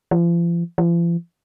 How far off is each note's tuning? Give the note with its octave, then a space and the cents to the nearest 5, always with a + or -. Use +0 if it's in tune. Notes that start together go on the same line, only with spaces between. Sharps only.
F3 -40
F3 -45